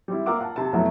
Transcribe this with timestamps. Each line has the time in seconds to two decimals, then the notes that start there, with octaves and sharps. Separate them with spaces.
0.08 G3 C4 E4
0.26 A#3 F4 A#4 F#5 D6 E6
0.39 F5 F#5 A5
0.56 C3 A5
0.73 F2 B2 F#3 A3 E4 A5